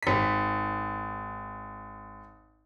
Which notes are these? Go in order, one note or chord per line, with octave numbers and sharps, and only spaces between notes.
G#1 B6